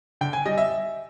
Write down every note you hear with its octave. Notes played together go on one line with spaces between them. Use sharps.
D3 G5
G#5
G3 D#5
E5